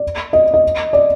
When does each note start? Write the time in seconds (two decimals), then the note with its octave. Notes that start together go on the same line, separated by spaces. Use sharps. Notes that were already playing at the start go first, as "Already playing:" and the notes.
Already playing: D5
0.33 D#5
0.54 D#5
0.93 D5